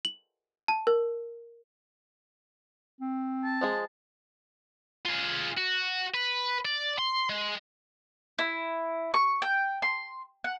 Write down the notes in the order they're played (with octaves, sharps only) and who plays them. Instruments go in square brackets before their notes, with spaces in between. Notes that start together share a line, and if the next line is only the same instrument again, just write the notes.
[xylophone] F#7
A5
A#4
[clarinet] C4
[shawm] A5
[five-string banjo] F3 G#3 G#4
[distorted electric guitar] F4 G#4
F#4
B4
D5
C6
G#3
[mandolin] E4
C#6
G5
C6
F#5